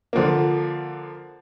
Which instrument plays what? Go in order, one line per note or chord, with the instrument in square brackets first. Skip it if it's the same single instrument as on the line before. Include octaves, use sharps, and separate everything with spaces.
[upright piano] D3 F3 A#3